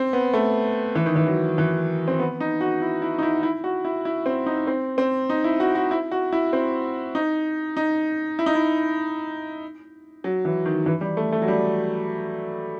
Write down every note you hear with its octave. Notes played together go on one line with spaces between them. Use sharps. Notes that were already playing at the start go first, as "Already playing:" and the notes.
Already playing: C4
B3
A3
E3
D#3
E3
F#3
E3
C4
B3
D#4
F#4
E4
E4
D#4
E4
E4
F#4
E4
E4
C4
D#4
C4
C4
D#4
E4
F#4
F#4
E4
F#4
E4
C4
D#4
D#4
E4
D#4
E4
F#3
E3
D#3
E3
G3
A3
A3
F#3
G3